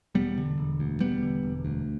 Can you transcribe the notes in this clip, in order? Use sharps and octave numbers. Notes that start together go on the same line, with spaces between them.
E1 G3 B3
D3
E1
D2
E1 G3 B3
D3
E1
D2